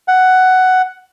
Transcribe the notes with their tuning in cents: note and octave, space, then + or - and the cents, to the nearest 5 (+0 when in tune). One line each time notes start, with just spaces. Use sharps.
F#5 +10